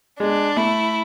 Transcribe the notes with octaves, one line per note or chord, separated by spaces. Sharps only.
G#3 D4
A3 E4